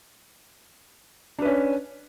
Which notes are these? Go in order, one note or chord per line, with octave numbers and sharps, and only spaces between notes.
C#4 D4 B4